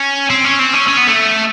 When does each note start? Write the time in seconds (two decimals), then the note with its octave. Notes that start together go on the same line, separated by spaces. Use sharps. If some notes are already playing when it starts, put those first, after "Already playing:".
Already playing: C#4
0.30 C4
0.45 C#4
0.59 C4
0.74 C#4
0.88 C#4
0.97 B3
1.07 A3